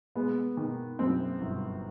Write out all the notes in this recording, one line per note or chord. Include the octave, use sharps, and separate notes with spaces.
G#3 B3
D#3
F#2 C4
G1